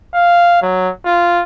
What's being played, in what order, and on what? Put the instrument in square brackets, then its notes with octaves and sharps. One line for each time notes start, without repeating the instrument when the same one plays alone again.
[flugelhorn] F5
F#3
F4